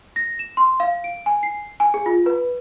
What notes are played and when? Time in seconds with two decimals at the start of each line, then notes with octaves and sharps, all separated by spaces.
0.16 A#6
0.39 E7
0.57 C6
0.80 F5
1.04 D7
1.26 G#5
1.43 C7
1.80 G#5
1.94 G#4
2.06 F4
2.26 B4